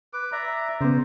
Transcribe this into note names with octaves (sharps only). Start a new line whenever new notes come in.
B4 D6
D5 E5 A#5
C#3 B3 C5